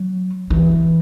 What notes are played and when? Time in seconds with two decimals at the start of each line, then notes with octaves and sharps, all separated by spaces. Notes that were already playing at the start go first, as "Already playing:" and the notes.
Already playing: F#3
0.50 E3